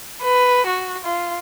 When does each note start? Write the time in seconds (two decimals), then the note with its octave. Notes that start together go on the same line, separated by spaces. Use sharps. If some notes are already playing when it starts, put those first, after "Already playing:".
0.22 B4
0.67 F#4
1.04 F4